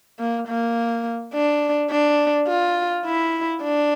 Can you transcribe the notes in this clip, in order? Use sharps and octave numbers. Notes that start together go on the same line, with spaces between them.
A#3
A#3
D4
D4
F4
E4
D4